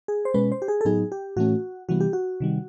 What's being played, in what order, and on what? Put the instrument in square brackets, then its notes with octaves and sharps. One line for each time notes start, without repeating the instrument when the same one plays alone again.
[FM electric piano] G#4
C5
B2 G#3 C#4 B4
C5
G4
G#4
A4
A2 F#3 B3 D#4 G#4
G4
A2 E3 A3 C#4 F#4
C3 E3 G3 B3 F#4
G4
F#4
C3 D#3 G3